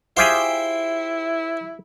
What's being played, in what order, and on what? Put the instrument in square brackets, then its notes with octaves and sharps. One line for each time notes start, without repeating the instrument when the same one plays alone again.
[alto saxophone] E4 [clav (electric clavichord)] F4 G4 G#4 [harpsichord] C5 E5 G5